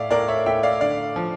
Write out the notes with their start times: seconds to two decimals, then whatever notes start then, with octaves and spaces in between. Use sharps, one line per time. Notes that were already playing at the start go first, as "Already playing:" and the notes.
Already playing: A2 D5 E5 F5
0.10 A2 A#4 D5
0.28 C#5 E5
0.46 A2 E5 G5
0.63 D5 F5
0.81 D3 D5 F5
1.16 F3